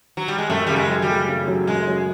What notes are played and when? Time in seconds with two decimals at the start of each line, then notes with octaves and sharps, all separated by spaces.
0.17 F#3
0.28 G3
0.38 G#3
0.49 F#2 A3
0.67 C#3 G3
0.76 G#3
0.89 F#3
1.02 G3
1.09 A3
1.29 C#3
1.48 F#3
1.67 F#2 G#3
1.87 F#3